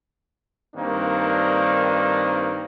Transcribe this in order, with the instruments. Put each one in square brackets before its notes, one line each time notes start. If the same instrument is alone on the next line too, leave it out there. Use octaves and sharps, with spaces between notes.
[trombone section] G2 D#3 A#3 C4 D4